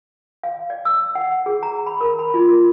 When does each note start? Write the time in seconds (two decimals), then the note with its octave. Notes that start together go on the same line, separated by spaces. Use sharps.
0.43 F5
0.70 D5
0.85 E6
1.15 F#5
1.46 G#4
1.63 A#5
1.86 B5
2.01 A#4
2.19 B5
2.34 F4
2.48 A#4